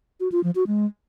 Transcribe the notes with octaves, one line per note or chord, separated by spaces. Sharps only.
F#4
F4
F3
F#4
G#3